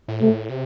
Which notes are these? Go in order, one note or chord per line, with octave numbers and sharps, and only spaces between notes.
A2
C3 A3
A2
C3